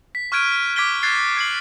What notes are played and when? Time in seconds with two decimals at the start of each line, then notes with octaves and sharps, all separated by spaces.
0.15 B6
0.32 C#6 F6 F#6 G#6 D7 D#7
0.76 D6 G#6 B6 D7 G7
1.03 F#6 G#6 A6 C7
1.37 G#6 C7 F#7